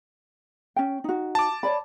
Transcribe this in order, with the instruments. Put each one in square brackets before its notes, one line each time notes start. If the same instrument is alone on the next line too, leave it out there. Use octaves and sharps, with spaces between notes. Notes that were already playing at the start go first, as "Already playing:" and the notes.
[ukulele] C#4 G5
D#4 F#4
[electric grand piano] A5 D6
[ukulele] C#5 D5 B5